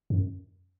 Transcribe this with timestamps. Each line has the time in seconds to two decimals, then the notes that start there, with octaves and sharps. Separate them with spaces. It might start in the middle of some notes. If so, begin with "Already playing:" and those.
0.10 F#2